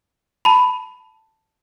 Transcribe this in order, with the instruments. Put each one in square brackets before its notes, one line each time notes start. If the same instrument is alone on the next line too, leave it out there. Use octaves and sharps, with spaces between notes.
[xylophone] A5 B5